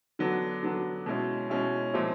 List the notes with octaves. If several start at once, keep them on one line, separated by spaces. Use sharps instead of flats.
D3 F#3 B3 D4
D3 F#3 B3 D4
B2 G#3 C#4 E4
B2 G#3 C#4 E4
A#2 F3 G#3 C4 E4